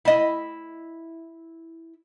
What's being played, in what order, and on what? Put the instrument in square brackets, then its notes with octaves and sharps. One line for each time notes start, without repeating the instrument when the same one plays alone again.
[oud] E4 D#5